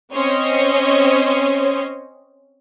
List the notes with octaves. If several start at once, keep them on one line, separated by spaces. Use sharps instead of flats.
C4 C#4 C5 C#5 D#5